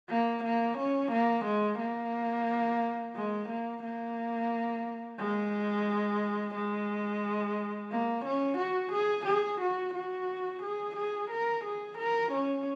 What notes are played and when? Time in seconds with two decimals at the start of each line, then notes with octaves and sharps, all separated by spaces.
0.10 A#3
0.44 A#3
0.78 C#4
1.12 A#3
1.45 G#3
1.79 A#3
3.16 G#3
3.49 A#3
3.84 A#3
5.19 G#3
6.55 G#3
7.91 A#3
8.25 C#4
8.58 F#4
8.93 G#4
9.26 G#4
9.61 F#4
9.95 F#4
10.63 G#4
10.97 G#4
11.31 A#4
11.65 G#4
11.98 A#4
12.33 C#4